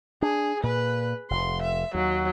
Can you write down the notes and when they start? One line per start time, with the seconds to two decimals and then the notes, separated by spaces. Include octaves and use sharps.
0.22 D4 G#4
0.63 A#2 B4
1.30 F1 C6
1.62 E5
1.95 D#2 F#3